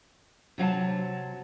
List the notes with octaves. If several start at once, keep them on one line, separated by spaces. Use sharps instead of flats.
C3 F#3 F5 A5